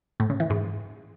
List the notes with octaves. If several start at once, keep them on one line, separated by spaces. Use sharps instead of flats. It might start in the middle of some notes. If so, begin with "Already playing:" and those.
A2
C#3
E3
G#2